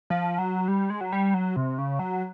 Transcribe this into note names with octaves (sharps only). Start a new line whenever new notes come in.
F3
F#3
G3
G#3
F#3
G3
F#3
C3
C#3
F#3